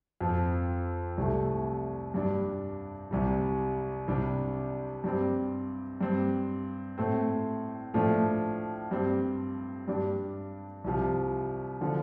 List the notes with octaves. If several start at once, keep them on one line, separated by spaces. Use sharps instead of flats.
F2 F3 C4
C2 C3 A3
G2 G3 D4
C2 C3 G3
C2 C3 G3 D4
G2 G3 C4
G2 G3 C4
A2 A3 C4
A2 F3 A3 D4
G2 G3 C4
G2 G3 D4
C2 C3 F3
D3 F3